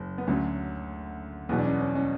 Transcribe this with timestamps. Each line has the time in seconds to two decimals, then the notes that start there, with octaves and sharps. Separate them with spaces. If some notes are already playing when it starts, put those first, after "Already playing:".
Already playing: F#1
0.18 B3
0.27 D2 D3 F#3 C#4
1.49 E2 B2 F#3 B3
1.58 D4
1.65 C#4
1.80 C#4
1.95 C#4